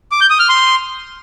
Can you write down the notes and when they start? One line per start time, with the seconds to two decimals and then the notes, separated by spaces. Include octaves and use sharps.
0.11 D6
0.21 G6
0.30 D#6
0.40 F6
0.49 C6